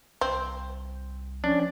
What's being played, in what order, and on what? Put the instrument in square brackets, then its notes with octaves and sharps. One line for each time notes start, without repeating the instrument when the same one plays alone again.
[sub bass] C2 [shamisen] C4
[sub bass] F3 [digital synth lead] C#4 [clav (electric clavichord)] D4